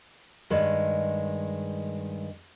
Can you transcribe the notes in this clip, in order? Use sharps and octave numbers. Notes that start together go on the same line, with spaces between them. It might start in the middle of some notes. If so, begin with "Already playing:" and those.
G2 D#3 G#3